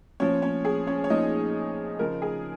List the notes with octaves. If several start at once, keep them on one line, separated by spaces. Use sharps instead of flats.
A#2 F3 C#4 C#5
C#4 C#5
G#4
C#4 C#5
C#5
A#2 F3 D#4 D#5
C#3 F3 A#4
G#4